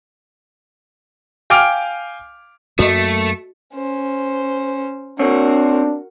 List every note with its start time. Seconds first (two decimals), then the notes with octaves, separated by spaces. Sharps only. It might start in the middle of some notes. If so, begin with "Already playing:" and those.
1.50 F5 G5 G#5 D6 F6 D7
2.79 F#2 A3 A#3 F#4 D#5
3.74 C#4 C5
5.19 C4 D4 F#4 A#4 C#5